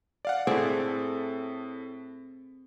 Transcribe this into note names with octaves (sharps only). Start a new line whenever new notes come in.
D5 F5 F#5
A2 C4 G#4 A4 D5